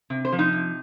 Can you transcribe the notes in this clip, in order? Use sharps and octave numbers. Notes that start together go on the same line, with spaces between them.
C3
C5
F3
D#4
C3